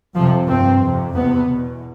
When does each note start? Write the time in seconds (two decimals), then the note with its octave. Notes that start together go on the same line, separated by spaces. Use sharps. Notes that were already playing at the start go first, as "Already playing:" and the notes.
0.15 F2 C3 F3
0.49 G2 C4
0.83 F2 C3
1.15 E2 C3 B3
1.49 E2 B2